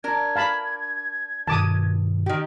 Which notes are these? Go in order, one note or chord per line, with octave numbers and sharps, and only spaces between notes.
D4 A#4 G#6
F5 A5 B5
G2 B2 D#3 A5 D6 D#6
D#3 G4